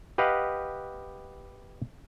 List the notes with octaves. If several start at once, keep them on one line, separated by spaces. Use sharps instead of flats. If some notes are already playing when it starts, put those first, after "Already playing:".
G4 B4 D#5 F5 F#5